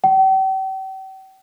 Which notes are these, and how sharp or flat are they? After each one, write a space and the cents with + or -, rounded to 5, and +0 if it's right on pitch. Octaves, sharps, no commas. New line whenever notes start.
G5 -40